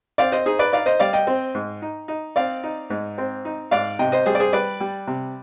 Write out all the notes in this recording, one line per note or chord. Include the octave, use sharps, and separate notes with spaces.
C4 D5 F5
C5 D#5
D#4 G#4 C5
B4 D5
D#4 D5 F5
C5 D#5
G3 D5 F5
D#5 G5
C4
G#2
D#4
D#4
C4 D5 F5
D#4
G#2
C4
D#4
G#2 D5 F5
C3 D#5 G5
C5 D#5
G3 G#4 C5
D5
G#4 C5
G3 B4 D5
G3
C3